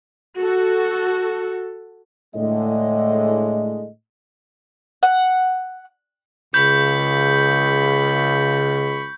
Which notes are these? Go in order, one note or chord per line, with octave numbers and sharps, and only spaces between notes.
F#4 A4
A2 D3 G#3 D#5
F#5
C#2 C#3 B5 C#6 G6